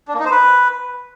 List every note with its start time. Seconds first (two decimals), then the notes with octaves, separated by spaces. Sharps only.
0.08 D4
0.14 A#3
0.20 D#4
0.25 C5
0.31 B4